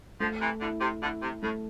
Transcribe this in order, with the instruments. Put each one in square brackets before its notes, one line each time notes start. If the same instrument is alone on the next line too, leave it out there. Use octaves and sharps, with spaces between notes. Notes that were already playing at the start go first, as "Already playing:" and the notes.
[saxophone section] D3 F3 [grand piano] A3
[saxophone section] C3 E3
[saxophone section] B2 D3 [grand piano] E4
[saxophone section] C3
[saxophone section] B2 D3 [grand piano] E4
[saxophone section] C3
[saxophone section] A2 [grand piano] A3